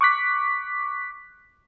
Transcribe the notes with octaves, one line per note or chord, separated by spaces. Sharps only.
C#6 D6 F#6 B6